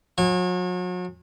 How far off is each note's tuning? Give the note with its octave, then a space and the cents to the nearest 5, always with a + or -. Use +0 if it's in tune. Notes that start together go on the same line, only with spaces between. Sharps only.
F#3 -40 G#5 -25